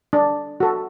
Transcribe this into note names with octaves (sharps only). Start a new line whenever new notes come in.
D4
F#4 A4